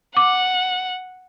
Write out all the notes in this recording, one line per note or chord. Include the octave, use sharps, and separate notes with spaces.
F#5 D6